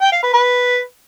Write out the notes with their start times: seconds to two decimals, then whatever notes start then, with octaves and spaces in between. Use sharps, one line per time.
0.01 G5
0.12 F5
0.23 B4
0.34 B4